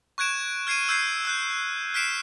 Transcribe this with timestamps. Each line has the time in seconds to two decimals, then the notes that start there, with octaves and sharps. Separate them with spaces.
0.18 C#6 F#6 G#6 D7 E7
0.67 F6 G#6 C7 D7 D#7
0.89 E6 G6 G#6 C7
1.25 E6 F#6 G6
1.94 F6 F#6 B6 C7 D7 E7